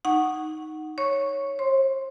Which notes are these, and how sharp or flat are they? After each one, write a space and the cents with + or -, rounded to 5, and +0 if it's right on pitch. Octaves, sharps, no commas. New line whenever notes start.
D#4 +0 F#5 +0 C#6 -10
C#5 +0 C#6 +0
C5 +45 C6 +0